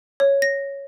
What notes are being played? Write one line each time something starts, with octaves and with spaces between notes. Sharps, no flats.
C#5
A#6